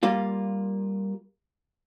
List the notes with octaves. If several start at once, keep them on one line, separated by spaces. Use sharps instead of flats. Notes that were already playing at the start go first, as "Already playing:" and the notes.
G3 A#3 F4